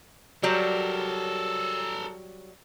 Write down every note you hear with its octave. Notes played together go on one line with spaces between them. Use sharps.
F#3 G3 A4 A#4